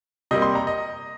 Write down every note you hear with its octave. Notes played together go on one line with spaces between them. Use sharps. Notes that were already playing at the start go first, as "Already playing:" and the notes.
C3 G3 A#3 D#5
C6
A#5
D#5